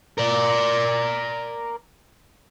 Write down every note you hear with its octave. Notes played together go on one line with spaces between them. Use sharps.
A#4 D5